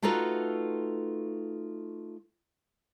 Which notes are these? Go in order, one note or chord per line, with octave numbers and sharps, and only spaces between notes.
A3 D#4 F4 F#4 A4 B4